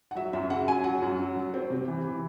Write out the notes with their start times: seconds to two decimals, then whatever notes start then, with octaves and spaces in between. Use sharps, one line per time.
0.11 F#5
0.15 F#3 E5
0.33 F#2 E5
0.50 C#3 F#5
0.67 F#3 G#5
0.84 F#3 F#5
1.02 F#2
1.19 F#3
1.36 F#3
1.54 C4
1.70 C3
1.88 E3
2.05 E3